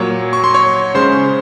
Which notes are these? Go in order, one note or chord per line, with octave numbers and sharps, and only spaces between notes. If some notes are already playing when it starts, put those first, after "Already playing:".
Already playing: A#2 F#3 A#3 C#5 C#6
C#6
C6
C#5 C#6
C#3 G#3 C#4 C5 C6